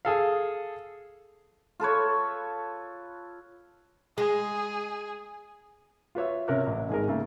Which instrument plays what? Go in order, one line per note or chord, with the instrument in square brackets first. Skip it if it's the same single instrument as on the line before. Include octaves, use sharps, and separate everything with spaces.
[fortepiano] G#4 A4 F5
[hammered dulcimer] F4 A4 B4 C#5
[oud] G#3 [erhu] G#4
[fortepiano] F4 B4 C#5 E5
C3 C#4 A#4 C#5 F#6
A1
G#1 G#4 A#4
C#3 A3 A#3